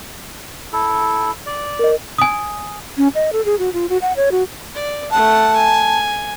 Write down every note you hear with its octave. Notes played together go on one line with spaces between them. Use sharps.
E4 A4
D5
A#4 D#5
G#5 D#6
C#4
D#5
A4
G#4
F#4
F4
F#4
F#5
C#5
F#4
D5
A3 F#5 A5
G#5